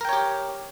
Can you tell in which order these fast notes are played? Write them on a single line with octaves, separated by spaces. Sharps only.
A#4 G5 C#5 G4